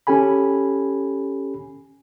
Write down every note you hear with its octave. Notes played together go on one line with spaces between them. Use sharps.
C#4 G4 A4 G#5 B5